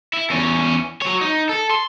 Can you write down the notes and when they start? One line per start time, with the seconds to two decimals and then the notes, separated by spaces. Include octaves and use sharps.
0.13 E4
0.30 E2 C#4
1.02 F#3 C#5
1.21 D#4
1.49 A4
1.71 C6